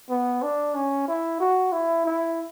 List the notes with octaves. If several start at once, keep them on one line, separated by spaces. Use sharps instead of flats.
B3
D4
C#4
E4
F#4
E4
E4